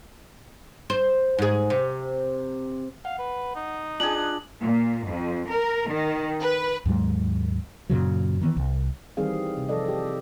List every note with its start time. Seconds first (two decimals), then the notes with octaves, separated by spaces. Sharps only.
0.90 C5
1.39 G#2 G#4
1.70 C3
3.05 F5 F#5
3.19 B4
3.55 D#4
4.00 D4 F4 G#4 G#5 F#7
4.60 A#2
5.06 F2
5.49 A#4
5.88 D#3
6.40 B4
6.86 D#2 G#2 F#3 G#3
7.90 F#2 A#2 C#3 F#3
8.41 D#3 E3 B3
8.57 C2
9.17 D#3 E3 G3 C4 G#4 F5
9.57 C3
9.69 F3 A4 D5 D#5
9.85 G4 A4